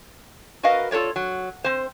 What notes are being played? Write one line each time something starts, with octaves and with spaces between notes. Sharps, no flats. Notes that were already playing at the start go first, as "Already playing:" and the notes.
F#4 A#4 B4 D#5 F5
F4 A4 A#4 C#5 D5
F#3
C4 C5